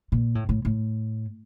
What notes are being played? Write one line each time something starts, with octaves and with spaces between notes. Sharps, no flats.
A#2
A2
A2
A2